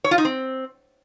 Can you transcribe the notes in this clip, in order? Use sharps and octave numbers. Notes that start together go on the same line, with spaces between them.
C#5
F4
D#4
C4